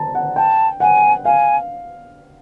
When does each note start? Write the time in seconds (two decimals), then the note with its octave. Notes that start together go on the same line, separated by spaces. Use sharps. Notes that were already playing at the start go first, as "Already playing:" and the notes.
Already playing: A5 A#5
0.15 F#5
0.36 G5 A5
0.80 F#5 G#5
1.25 F5 G#5